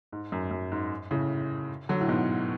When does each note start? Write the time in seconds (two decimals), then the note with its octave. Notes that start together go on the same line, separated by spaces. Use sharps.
0.12 G#2
0.32 F#2
0.51 F#2
0.72 G#2
1.11 A2 C#3
1.89 D3 F#3
2.01 A2
2.08 G#2 B2